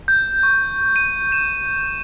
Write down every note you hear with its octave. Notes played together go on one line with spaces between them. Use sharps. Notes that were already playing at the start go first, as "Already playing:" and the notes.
G6
C#6
D#7
E7